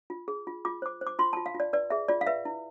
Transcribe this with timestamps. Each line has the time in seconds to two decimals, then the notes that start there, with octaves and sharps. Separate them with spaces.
0.10 F4
0.28 G#4
0.47 F4
0.65 F4 D6
0.82 C5 D6
1.01 C5
1.07 D6
1.19 F4 C6
1.33 A5
1.37 F4
1.46 F5
1.55 F4
1.60 D5
1.73 B4 D5
1.90 G#4 E5
2.09 F4 D5
2.21 F5
2.27 B4 E5
2.45 E4